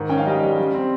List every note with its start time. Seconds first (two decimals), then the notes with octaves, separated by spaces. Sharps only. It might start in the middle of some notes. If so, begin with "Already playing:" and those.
Already playing: G#2 D#3
0.09 C#4 G5
0.18 F5
0.26 G3 D#5
0.43 G3
0.58 G3
0.74 C4